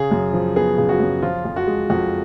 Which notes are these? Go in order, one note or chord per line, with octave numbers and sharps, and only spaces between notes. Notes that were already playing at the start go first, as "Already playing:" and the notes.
Already playing: C#3 G#4
F#2
F3
B3 G#4
C#3
F#4
F#2
F3 F4
F2
F#4
G#3
F2 F#4